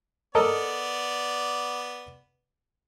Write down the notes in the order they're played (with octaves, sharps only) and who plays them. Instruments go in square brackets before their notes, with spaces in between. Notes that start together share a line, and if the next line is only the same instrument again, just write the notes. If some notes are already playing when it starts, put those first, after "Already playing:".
[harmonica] B3 D5 [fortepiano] A4 A#4 D#5